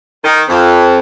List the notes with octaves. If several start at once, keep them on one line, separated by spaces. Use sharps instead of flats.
D#3
F2